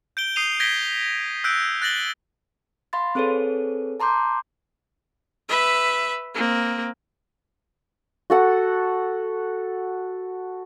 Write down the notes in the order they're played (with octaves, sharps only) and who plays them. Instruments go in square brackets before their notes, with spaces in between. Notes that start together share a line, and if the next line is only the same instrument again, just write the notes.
[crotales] G6 D7 G7
D#6 C7 D#7 F7
G6 G#6 A#6 B6 D7 G7
E6 F#6 G6 D7
F#6 A6 A#6 F#7 G7
[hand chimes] F5 B5 C6 A6
C4 G#4 A4 B4 C#5
A5 A#5 C6 D6 G6
[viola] B4 E5
A#3 C4
[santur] F#4 A4 F#5